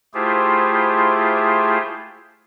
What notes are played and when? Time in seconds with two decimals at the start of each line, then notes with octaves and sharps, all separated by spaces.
0.14 A3 E4 F4 G4 G#4 C5